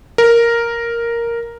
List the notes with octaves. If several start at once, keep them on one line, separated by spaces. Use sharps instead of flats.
A#4